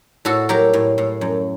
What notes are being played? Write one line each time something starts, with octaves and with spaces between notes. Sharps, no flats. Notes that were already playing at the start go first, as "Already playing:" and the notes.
A2 F#4 A4
F#3 G4 A#4
A2
A2
F#2